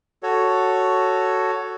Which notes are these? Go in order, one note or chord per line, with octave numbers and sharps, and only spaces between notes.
F#4 A4 C#5